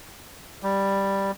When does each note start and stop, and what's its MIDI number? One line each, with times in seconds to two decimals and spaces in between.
0.63 1.31 55